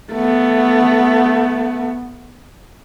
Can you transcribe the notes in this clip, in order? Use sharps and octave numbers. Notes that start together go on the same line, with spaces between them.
A3 B3